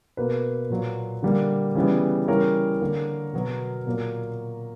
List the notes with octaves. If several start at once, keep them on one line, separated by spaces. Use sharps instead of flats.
B2 A#3 B4
A#2 F#3 A#3
D3 G3 A#3
C#3 E3 G3 B3
C#3 E3 G3 A#4 C#5
D3 A#3
B2 F#3 B3
A#2 F#3 A#3